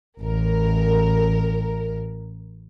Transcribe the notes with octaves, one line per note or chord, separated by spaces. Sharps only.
A1 A#4